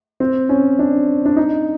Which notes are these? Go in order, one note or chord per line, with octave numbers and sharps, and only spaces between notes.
C4
C#4
D4
D4
D#4